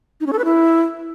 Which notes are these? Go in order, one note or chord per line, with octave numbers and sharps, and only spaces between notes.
D#4
C#4
A4
B4
E4